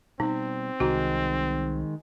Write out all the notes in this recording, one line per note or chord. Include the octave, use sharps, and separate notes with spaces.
B2 G3 C4 D#4
C2 D#3 G#3 F#4 A#5